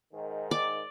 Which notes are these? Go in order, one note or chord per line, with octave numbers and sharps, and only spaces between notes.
G#2 D#3
D5